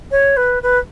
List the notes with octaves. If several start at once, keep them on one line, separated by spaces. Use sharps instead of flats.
C#5
B4
B4